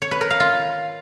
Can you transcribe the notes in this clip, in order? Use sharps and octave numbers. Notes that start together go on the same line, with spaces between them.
C#5
B4
A#4
F5
F4